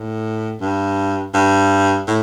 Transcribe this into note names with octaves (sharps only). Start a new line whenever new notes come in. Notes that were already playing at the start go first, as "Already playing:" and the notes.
Already playing: A2
G2
G2
A2